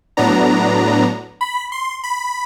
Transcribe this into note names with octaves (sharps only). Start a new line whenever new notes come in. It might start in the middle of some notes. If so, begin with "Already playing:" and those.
A2 F#3 B3 D4 A#5
B5
C6
B5